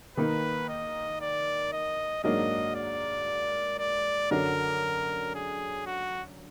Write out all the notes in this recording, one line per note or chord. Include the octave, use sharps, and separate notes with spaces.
D#3 A#3 D#4 B4
D#5
D5
D#5
G#2 F#3 A#3 D4 D#5
D5
D5
F#2 D3 F#3 D4 A#4
G#4
F#4